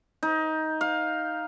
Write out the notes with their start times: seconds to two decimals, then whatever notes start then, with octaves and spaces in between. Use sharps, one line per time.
0.23 D#4
0.81 F5